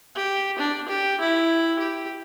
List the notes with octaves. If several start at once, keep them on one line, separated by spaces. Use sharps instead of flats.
G4
D4
G4
E4
G4